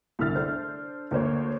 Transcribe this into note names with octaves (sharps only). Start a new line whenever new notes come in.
C2 A2 D3 E5 F6 A6
D4 A4 C5
D2 A#3 C5 C#5